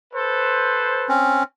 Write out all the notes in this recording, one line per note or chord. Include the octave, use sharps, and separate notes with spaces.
A4 B4 C5
C4 C#4